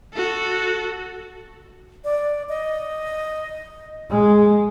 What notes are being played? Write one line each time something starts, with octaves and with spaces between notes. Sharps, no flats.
F#4 A4
D5
D#5
G#3